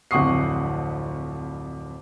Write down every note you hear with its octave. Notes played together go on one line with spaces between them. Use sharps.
D1 F2 F#5 C#6 D#6 C7